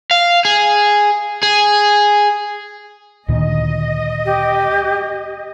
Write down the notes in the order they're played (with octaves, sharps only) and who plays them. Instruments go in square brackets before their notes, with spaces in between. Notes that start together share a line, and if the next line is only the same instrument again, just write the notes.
[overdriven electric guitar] F5
G#4
G#4
[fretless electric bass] D2 A#2 D#3 [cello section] D#5
[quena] G4